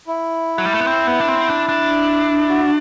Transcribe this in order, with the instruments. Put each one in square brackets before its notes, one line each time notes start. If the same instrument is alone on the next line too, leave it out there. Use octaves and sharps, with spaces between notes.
[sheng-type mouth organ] E4
[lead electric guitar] F#3
G3
A3
B3
C4
B3
D4
C4
D4
D4
[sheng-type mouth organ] F#4